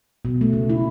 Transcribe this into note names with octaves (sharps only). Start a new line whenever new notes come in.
B2
A3
C#3
E4